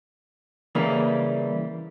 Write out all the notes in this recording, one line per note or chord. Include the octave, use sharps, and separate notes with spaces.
C#3 E3 G3 A#3